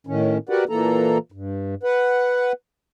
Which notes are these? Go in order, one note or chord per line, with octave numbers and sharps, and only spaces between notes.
A2 D#3 C#4
F#4 G4 A#4 B4 D5 F#5
A#2 E3 A#3 A4 A#5
G2
B4 F#5